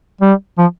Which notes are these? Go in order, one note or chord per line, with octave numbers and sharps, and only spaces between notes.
G3
F3